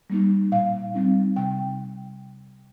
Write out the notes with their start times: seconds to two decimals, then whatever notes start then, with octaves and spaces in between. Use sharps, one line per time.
0.10 G3 A#3 D#4
0.52 A#2 F5
0.94 G3 C4 D#4
1.36 C3 G5